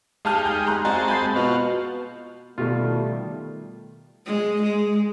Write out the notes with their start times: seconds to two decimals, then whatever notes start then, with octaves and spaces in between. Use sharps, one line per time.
0.25 G#3 D#4 G4 F5 A5 F6
0.45 G6
0.67 A#5 C6 F#6
0.85 G#3 C4 F#4 D#5 F5 A5
1.08 B5 G6 C7
1.36 B2 F4 F#4
2.58 B2 D#3 G3 A3 F4
4.26 G#3
4.62 G#3